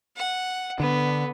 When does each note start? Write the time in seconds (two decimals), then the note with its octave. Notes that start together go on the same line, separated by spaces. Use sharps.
0.16 F#5
0.80 D3 B3